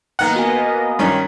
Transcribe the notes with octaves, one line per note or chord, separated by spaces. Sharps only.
D#3 A#3 B3 D#5 F#5
F#4 G#5
G2 D#3 C#4